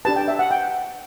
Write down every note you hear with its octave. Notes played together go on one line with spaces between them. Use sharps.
D4 G4 B4 A5
G5
E5
F#5
G5